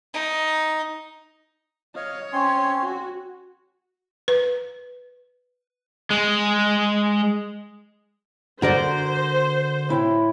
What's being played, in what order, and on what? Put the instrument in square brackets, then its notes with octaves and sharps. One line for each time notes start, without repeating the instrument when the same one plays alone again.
[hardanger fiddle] D#4
[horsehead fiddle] C#5 [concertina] D#5 F5
[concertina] C4 G#5 C6 [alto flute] C#4
[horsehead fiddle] F#4
[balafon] B4
[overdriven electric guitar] G#3
[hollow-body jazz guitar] D3 D5 [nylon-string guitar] F#4 A#4 [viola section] C5
[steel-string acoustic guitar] A2 E4 G5